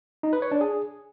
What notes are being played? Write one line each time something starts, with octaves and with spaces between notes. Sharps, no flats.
D#4
B4
C#5
D4
G#4